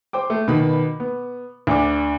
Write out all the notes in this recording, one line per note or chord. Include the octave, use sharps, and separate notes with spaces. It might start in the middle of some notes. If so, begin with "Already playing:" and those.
C5 G5 D6
A3
B2 D#3 B4 B5
B3
D2 D4 D6